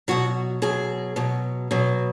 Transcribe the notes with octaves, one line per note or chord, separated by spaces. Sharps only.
B2 F#3 F#4
B2 F#3 G#4
B2 F#3
B2 F#3